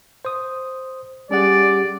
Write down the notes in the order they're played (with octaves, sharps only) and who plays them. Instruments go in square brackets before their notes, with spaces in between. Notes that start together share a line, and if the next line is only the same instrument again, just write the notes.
[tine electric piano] C5 D#6
[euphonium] G3 [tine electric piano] C#4 G#4 F#5 [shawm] D5